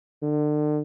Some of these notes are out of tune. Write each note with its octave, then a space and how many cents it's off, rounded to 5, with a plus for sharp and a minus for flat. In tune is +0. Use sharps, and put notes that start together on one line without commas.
D3 +35